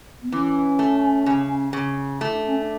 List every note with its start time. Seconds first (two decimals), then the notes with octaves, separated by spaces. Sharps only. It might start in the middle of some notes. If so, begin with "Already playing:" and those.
0.22 B3
0.32 E3 C#4
0.79 A3
1.26 C#3
1.73 C#3
2.21 A3 E4
2.33 D4
2.46 C#4
2.58 D4